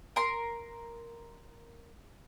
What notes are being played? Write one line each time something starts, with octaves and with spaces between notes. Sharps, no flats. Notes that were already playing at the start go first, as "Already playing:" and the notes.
A#4 C6